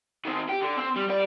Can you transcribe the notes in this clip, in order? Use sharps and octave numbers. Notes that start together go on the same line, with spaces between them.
D#3 C4
G4
D3
C4
G3
G3 D5